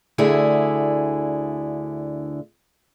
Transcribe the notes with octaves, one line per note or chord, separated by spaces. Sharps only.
D2 D3 E4 G#4